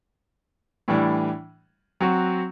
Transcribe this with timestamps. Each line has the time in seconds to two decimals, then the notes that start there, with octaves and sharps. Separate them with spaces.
0.88 A2 E3 G3 D4
2.00 F#3 C4 F#4